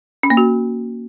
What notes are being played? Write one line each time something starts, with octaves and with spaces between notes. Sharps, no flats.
C#4
A#3
F#4